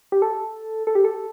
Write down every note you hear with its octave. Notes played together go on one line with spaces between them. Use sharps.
G4
A4
A4
G4
A4